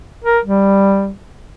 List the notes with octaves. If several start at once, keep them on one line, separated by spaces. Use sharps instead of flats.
A#4
G3